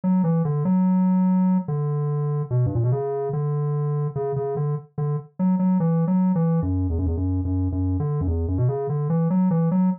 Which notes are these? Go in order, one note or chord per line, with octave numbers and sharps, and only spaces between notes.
F#3
E3
D3
F#3
D3
B2
G2
A#2
B2
C#3
D3
C#3
C#3
D3
D3
F#3
F#3
E3
F#3
E3
F#2
E2
F#2
E2
F#2
F#2
F#2
D3
F#2
E2
F#2
B2
C#3
D3
E3
F#3
E3
F#3